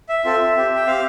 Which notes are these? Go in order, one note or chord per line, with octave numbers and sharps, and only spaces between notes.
E5
C4 F4 A4
C4 G4
G5
C4 G4 F5